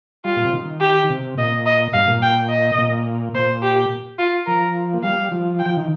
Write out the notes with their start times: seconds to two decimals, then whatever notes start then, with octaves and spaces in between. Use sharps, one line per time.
0.25 G3 F4
0.36 A#2
0.45 C3
0.53 D#3
0.81 G4
1.09 C3
1.37 A#2 D#5
1.66 D#5
1.93 G2 F5
2.08 A#2
2.22 G5
2.50 D#5
2.78 A#2
3.35 A#2 C5
3.63 G4
4.19 F4
4.47 F3 A#4
4.94 A#3
5.03 G3 F5
5.32 F3
5.59 G5
5.66 F3
5.77 D#3